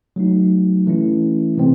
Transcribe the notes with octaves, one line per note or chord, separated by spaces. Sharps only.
F#3 A3 D#4
E3 A3 C#4 E4
C3 E3 G#3 C4